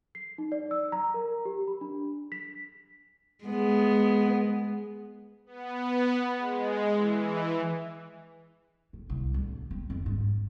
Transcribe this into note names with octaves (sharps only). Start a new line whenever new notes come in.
C7
D#4
D5
E6
A#5
A#4
G4
B5
D4
B6
G#3 B3
B3
G#3
E3
A2
C2
D1
C4
F2
G#2